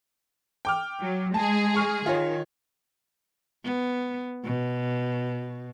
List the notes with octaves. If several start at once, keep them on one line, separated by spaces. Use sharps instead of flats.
G5 D6 F6
F#3
G#3 G#4 A5
G#5 C#6 F6
D#3 F4 C#5
B3
B2